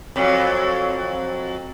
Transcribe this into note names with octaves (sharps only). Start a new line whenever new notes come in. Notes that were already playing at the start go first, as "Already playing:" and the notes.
F2 F#3